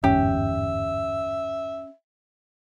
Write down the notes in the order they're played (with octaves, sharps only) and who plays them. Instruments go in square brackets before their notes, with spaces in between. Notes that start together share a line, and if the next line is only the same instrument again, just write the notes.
[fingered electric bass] G1 E2 G#2 [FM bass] C#4 [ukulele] G4 [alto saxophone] E5